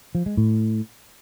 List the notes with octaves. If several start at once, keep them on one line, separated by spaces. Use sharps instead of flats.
F3
G#3
A2